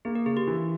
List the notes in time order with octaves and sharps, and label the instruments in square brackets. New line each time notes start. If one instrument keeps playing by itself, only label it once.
[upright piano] A#3 [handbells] G#4
[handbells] A#4
[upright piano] C#3 [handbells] G#4
[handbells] G4
[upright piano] E3